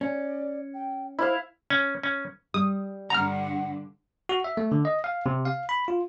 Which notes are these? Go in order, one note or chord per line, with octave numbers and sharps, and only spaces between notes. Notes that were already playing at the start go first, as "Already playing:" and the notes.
C#4 D5
G5
E4 C5 F5
C#4
C#4
G3 D#6
G2 D3 F#5 A#5 F6
F#4
E5
A3
D3
D#5
F5
C3
F5
B5
F4